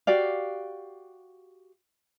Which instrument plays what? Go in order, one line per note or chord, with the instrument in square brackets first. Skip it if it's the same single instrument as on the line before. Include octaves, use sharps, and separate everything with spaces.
[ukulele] F#4 G4 D5 F5